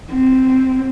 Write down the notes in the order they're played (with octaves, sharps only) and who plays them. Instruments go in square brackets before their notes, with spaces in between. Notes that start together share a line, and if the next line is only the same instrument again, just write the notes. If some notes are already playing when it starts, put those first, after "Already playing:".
[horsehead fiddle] C4